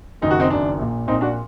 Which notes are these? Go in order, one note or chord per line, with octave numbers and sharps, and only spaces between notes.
F#1 F#2 D#3 D#4
F#4
C4 D#4
F#1 F#2 D#3 D4
A#1 A#2
A#1 A#2 C4 D#4
D4 F#4